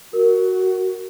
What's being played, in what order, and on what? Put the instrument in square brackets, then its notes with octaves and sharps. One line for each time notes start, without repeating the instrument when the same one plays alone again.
[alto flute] F#4 [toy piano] A#4